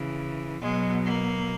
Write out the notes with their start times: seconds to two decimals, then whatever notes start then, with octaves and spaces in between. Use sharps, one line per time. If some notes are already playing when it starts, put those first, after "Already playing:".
Already playing: C#3 E3
0.62 B2 F#3 G#3
1.04 A#3